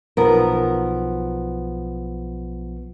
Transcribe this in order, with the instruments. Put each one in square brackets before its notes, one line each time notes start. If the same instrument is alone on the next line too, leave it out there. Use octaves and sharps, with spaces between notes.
[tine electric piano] B1 F3 B3 [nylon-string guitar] A#4